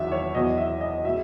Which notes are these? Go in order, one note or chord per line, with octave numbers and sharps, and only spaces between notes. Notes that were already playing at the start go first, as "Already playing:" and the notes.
Already playing: E2 D#3 F#3 E5
C#5
E2 B2 F#3 D#5
E5
D#5
B2 G#3 E5